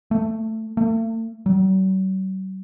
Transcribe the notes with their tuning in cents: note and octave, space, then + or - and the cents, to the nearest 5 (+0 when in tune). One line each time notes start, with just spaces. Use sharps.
A3 +10
A3 +40
F#3 +45